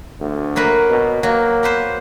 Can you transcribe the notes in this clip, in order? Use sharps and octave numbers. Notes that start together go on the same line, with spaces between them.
D2
F#3 A#3 B4
B2
F#3 A#3
B3 B4 C5